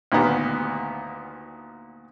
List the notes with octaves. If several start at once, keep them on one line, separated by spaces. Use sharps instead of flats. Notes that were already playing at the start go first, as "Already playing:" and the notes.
D2 A#2 D#3 B3 G4